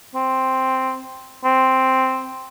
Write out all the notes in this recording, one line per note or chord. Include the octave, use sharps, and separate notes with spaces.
C4
C4